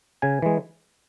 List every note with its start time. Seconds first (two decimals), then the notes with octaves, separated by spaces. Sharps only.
0.22 C#3 G#5
0.42 E3 G#3